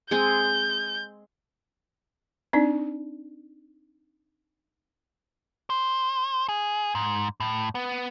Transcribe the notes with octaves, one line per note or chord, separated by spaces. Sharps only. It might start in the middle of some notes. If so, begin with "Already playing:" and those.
G#3 C4 G#4 G6
C4 D4 D#4 D5
C5
G#4
G#2
A2
B3